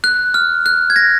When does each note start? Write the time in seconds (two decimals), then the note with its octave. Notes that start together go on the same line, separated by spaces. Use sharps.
0.04 F#6
0.34 F6
0.66 F#6
0.90 G#6
0.96 A#6